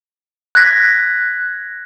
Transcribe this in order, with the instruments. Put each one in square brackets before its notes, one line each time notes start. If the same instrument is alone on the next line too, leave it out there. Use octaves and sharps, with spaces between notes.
[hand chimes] F#6 G#6 A#6 B6